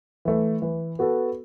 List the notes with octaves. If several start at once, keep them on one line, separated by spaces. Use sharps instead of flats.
E3 A3
E3
B3 F#4 A4